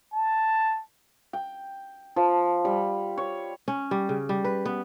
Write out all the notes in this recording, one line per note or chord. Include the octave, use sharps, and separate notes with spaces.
A5
G5
F3
G3
C#5
C#4
G3
C#3
G3
B4
B3